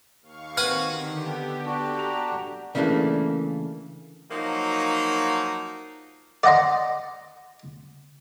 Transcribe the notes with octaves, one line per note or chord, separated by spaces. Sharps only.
D#2 F5 C#6
C4 F#4 B4 F#5 G#5 F6
D3 D#3 G4
B3
D4 F#4
A#5
C#3 E3 A3 A#3 D4
F3 F#3 A#3 D#4
D5 D#5 F#5 A#5 C6